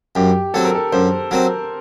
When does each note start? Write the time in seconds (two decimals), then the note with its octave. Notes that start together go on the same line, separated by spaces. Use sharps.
0.15 F#2 G4
0.54 F#3 C4 A4
0.65 A#4
0.75 A4
0.92 F#2 C5
1.31 F#3 C4 A#4